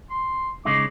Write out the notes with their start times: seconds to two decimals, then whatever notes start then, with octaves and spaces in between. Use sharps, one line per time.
0.10 C6
0.65 C#3 G#3 D#4 D6